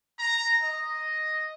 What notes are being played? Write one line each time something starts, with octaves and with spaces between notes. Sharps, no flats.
A#5
D#5